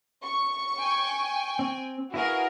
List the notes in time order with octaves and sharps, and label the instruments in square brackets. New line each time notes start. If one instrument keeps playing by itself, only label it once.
[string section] C#6
[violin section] G5 G#5
[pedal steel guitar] C4
[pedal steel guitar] E4 B4 F5 [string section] F#4 [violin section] G#4 A#4